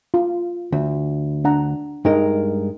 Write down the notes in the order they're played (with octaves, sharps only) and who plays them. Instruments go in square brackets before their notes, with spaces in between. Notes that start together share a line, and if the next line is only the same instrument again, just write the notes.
[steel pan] F4
[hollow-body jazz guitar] D2
[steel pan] D4 F#5 A#5
[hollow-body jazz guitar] G2 G#3 A#4 [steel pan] D#4